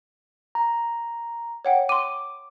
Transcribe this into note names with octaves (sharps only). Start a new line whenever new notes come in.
A#5
C#5 F#5 G5
C6 D6 D#7